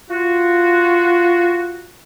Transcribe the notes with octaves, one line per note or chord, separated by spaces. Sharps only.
F4 F#4